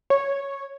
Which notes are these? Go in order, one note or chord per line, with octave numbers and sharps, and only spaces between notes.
C#5